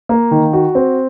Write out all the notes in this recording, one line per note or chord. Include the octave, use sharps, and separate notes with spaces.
A#3
D#3
F#4
C4